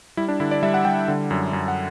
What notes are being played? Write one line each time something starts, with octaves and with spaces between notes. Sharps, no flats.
G3 E4
D4
D3 E4
D5
G3 E5
F#5
G3 G5
D3
F#2
F#2
F#5